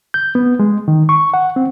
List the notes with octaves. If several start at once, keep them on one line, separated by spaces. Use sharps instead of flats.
G6
B3
G#3
D#3
C#6
F#5
C4